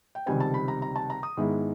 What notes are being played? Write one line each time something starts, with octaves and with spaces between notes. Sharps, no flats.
G5
C#2 C3 D#3 G3 C4 G#5
A5
B5
A#5
A#5
A5
A#5
D#6
G#2 D#3 G#3 B3 E4